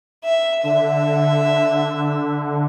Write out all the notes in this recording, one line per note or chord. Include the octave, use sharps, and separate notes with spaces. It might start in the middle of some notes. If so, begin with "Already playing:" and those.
E5
D3 E5